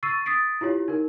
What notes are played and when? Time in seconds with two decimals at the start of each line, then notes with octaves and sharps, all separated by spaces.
0.03 C#6 E6 A6 C7 D#7
0.26 D#6 A6 B6 C7 D7
0.61 E4 F4 G4 C#5
0.88 D#4 A#4